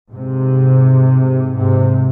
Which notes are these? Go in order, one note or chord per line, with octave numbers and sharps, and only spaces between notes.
G#2 C3
G#2 C3